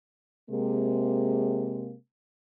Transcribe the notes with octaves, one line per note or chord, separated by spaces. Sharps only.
C3 G#3 A#3